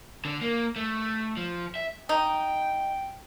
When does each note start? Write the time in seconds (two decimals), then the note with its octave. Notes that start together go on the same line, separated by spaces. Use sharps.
0.25 D3
0.41 A#3
0.76 A3
1.37 F3
1.76 E5
2.09 D#4 G5